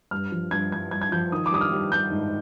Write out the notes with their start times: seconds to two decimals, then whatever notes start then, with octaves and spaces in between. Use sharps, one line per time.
0.11 G2 F6
0.32 F3
0.51 G2 G#6
0.72 G2 G#6
0.91 G2 G#6
1.02 G#6
1.12 F3 G6
1.32 D#3 D#6
1.46 D6
1.51 G3 D#6
1.61 F6
1.71 G3
1.92 G3 G6
2.11 G#2